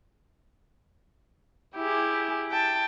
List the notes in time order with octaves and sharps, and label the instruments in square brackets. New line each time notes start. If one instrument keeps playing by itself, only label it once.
[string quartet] E4 G4 G#4
G5 A5